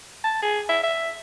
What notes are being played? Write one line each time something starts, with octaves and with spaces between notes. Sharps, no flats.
A5
G#4
E5
E5